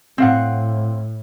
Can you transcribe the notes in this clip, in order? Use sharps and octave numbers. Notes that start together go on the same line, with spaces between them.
A2 C4 F5 F#5